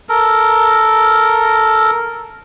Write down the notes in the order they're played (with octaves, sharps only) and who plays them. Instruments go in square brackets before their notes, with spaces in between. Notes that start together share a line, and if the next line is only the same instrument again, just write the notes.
[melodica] A4 A#4